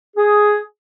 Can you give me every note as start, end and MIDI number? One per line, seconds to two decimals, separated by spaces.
0.17 0.56 68